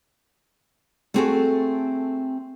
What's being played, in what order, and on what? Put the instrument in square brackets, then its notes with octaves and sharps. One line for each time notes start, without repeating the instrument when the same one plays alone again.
[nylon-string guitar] A3 B3 C4 F#4 G#4 A4